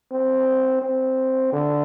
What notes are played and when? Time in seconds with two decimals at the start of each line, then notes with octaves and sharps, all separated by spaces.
0.12 C4
0.82 C4
1.53 D3